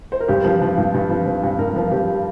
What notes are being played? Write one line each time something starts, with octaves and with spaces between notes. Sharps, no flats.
C5
A#4
G2 G4
F3
F3
G2
G2
F3
F3
G2
G2 A#4
F3
F3 G4